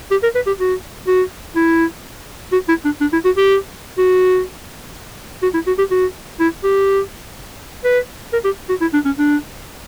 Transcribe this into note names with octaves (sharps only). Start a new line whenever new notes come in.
G4
A#4
B4
G4
F#4
F#4
E4
F#4
E4
D4
D4
E4
F#4
G4
F#4
F#4
E4
F#4
G4
F#4
E4
G4
B4
A#4
G4
F#4
E4
D4
C#4
D4